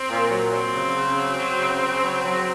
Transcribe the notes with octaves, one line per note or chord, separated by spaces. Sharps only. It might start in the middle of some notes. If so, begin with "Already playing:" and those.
Already playing: C4
A#2
F#3
F#3 C4
C#3
C#3
F#3
F#3
C#3
C#3
F#3
F#3